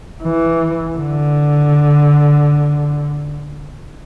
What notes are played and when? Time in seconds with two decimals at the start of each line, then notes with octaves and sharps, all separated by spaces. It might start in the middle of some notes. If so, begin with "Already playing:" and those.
0.23 E3
0.97 D3